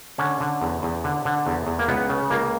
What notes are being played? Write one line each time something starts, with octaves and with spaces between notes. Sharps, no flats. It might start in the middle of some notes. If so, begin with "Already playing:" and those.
D3 C#4
D3
E2
E2
D3
D3
E2
E2
A#3
C#2 B3
C#3
C#2 A#3